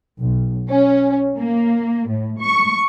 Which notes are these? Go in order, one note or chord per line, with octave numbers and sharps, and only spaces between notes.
B1
C#4
A#3
A2
C#6